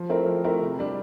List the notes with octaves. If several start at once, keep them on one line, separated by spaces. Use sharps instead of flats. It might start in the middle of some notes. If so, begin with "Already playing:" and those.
Already playing: F3
A3 C4 E4 A#4
F3
A3 C4 E4 A#4
C3
G3 D4